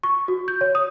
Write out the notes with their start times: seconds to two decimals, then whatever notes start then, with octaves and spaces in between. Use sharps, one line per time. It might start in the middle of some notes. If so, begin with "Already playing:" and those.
0.03 C#6
0.28 F#4
0.48 G6
0.61 C#5
0.75 D#6